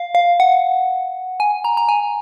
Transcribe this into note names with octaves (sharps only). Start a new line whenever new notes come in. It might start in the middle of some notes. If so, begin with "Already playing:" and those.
Already playing: F5
F5
F#5
G#5
A#5
A#5
G#5